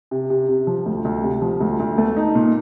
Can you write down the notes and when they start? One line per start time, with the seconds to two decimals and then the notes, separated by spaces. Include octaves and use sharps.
0.11 C3
0.30 C3
0.49 C3
0.67 F3
0.86 D2
1.05 D2
1.23 C3
1.42 F3
1.60 D2
1.80 D2
1.98 A3
2.17 D#4
2.35 A#2